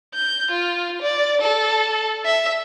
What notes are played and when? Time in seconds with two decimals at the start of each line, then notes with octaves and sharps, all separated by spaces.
0.14 G6
0.51 F4
1.02 D5
1.41 A4
2.26 E5